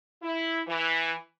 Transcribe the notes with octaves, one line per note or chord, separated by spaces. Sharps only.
E4
E3